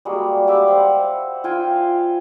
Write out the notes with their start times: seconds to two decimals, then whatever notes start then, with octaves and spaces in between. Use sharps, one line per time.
0.05 G3 G#3 A#3 F#4
0.48 G4 E5 B5 D6
0.68 C5 F#5
1.44 F4 G5 G#5
1.70 F5